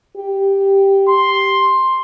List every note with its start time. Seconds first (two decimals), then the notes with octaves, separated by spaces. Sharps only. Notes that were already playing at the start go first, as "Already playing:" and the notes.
0.17 G4
1.08 C6